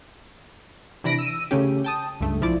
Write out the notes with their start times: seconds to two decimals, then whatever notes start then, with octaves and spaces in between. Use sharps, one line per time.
1.04 C3 E3 D4 B5 A#6 D7
1.18 E6 D#7
1.51 C#3 A3 C#4 G4
1.84 G5 A5 D#6
2.20 C#2 G2 A3
2.41 B1 F3 E4 D5